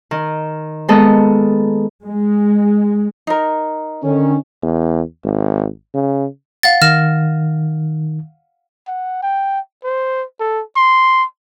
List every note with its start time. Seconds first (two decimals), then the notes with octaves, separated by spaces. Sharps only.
0.11 D#3
0.88 G#3 A#3 B3 A4 D#5
2.04 G#3
3.27 D#4 A#4
4.04 D3 D#3 C#4
4.63 E2
5.24 G#1
5.94 C#3
6.63 F5 F#5 A6
6.82 D#3 F6 A#6 E7
8.88 F#5
9.23 G5
9.84 C5
10.40 A4
10.76 C6